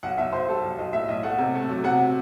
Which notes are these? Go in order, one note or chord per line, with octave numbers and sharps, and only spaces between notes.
B1 F#5
B1 E5
B1 C5
G3 A4
B1
B1 D#5
A2 E5
B1 D#5
A3 F#5
C3
A3
F#3
C3 F#5